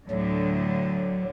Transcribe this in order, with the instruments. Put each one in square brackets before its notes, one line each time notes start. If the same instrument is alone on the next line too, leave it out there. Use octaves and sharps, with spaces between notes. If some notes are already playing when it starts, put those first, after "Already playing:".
[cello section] D2 A2 D3 [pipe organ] F#3